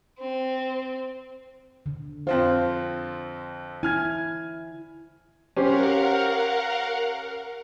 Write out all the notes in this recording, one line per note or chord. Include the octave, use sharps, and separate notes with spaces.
C4
D3
F2 C4 F4 C5
E4 G#5 F6 G#6
C#4 G4 A#4 C5 F5 F#5